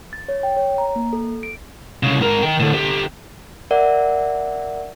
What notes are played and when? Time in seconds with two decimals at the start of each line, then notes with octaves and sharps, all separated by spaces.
0.13 A6
0.28 C#5
0.43 G5
0.57 C#5
0.78 A#5
0.96 A#3
1.13 A4
1.43 D7
2.03 C2 C#3
2.20 G#2 A#4
2.43 D#3 G5
2.60 A2 D3
2.73 D3 G4
3.71 A#4 D5 E5 F#5